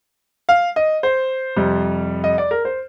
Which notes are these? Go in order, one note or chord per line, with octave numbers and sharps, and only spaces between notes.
F5
D#5
C5
F2 C3 G3
D#5
D5
A#4
C5